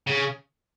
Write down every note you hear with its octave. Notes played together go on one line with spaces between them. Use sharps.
C#3